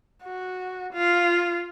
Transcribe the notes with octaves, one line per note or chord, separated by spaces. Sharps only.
F#4
F4